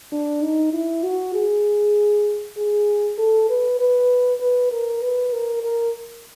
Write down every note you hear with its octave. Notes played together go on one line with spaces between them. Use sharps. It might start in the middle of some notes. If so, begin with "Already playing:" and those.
D4
D#4
E4
F#4
G#4
G#4
A4
B4
B4
B4
A#4
B4
A#4
A#4